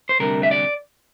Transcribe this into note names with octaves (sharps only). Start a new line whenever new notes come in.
C5
D2 C3 G3 D4 A#4
E5
D5